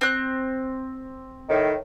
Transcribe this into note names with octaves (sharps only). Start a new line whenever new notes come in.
C4 F#6
A2 D#3